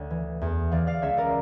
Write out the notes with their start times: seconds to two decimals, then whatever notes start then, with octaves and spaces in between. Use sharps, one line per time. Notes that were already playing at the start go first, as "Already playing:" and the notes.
Already playing: D2 C#5
0.10 E3
0.41 E2
0.72 E3 D5 F5
0.87 D5 F5
1.02 C#2 C#5 E5
1.17 A#4 D5